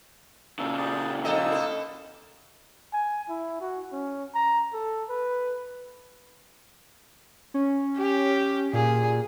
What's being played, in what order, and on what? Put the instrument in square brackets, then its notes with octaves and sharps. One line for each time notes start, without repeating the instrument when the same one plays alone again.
[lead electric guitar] A#2 C#3 [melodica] A4
[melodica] G4 G#4 D5
[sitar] F2 A4 D#5 [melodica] A#3 D#4 E6
[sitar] B2 D4 A4
[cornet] G#5
E4
F#4
C#4
A#5
A4
B4
[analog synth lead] C#4
[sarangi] G4
[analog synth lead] A#2 [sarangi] G#4